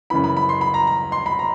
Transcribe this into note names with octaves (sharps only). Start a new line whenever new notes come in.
F#2 C#3 E3 B5
B5
B5
C6
B5
A#5
A#5
C6
B5
A#5